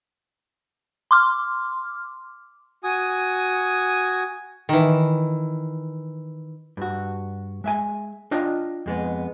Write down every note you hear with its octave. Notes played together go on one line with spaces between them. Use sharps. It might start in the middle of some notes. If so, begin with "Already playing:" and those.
C6 D6 F6
F#4 G#5 D#6
D#3 E3
G2 F#4
G#3 E5 G#5
D4 F4 D#5 G5
F2 G#3 B3